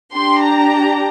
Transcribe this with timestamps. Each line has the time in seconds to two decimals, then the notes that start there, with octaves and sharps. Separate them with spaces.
0.14 D4 G4 C6
0.43 A#5